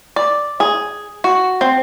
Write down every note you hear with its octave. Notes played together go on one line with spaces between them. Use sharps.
D5
G#4
F#4
C4